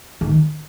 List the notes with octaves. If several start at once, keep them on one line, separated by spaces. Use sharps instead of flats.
D#3